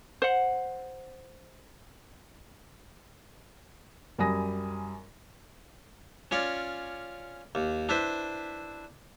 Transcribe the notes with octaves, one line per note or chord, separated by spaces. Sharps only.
C5 F#5
F#2 G3 G#5 B5 D#6 A#6
C#4 F4 C#5 D5
D#2
D4 E4 B4 C5